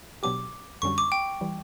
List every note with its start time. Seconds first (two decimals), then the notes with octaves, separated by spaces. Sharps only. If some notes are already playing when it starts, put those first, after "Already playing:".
0.23 B2 F#3 B3 D4 G4 D6
0.82 F#2 D3 G3 C#4 F#4 C#6
0.98 D6
1.12 G5
1.41 E3 G3